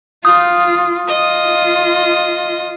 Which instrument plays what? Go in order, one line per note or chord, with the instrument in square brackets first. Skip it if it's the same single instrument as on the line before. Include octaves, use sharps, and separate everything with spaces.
[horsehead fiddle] F4 [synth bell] D#6
[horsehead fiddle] F4 [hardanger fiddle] D#5